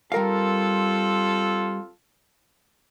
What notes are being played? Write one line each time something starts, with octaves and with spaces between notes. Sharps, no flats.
G3 C4 F4 A4 A#4 F5